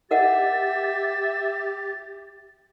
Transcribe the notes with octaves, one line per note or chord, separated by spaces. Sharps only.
G4 A#4 D#5 E5 F#5 A6